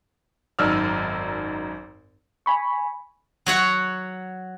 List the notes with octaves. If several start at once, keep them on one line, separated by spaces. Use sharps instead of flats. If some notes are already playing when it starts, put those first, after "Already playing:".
G#1 F#2 D#4 D5 E6 F6
G#5 B5 C#6
F#3 C#5 F#5